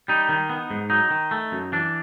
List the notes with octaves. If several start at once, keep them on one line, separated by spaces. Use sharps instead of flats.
G3 D#4
D#3
B3
G#2
F#3 D#4
D#3
A3
F#2
E3 D4